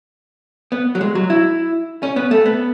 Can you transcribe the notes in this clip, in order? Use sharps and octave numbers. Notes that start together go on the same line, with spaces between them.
B3
F#3
G#3
F#3
E4
C#4
B3
A3
B3